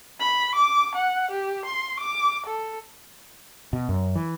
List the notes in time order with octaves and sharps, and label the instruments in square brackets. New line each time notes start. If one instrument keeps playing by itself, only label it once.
[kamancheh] B5
D6
F#5
G4
C6
D6
A4
[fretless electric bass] B2
F#2
E3